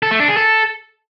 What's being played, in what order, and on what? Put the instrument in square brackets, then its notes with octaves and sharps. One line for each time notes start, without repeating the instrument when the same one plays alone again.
[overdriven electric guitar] A4
A3
D4
G#4
A4